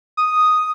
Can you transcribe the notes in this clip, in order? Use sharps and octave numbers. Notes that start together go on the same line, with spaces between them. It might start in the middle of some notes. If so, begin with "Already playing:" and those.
D#6